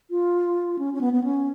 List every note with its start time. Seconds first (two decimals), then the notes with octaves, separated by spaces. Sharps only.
0.10 F4
0.79 C#4
0.94 C#4
1.01 B3
1.13 B3
1.24 C#4